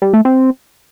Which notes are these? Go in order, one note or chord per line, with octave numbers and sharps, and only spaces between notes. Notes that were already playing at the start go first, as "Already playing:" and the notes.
G3
A3
C4